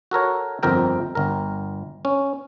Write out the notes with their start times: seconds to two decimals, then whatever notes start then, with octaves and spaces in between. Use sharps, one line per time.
0.11 F#4 A4 A#4 C#5
0.63 G1 F2 C4 A#4 G5
1.15 G1 A#4
2.05 C#4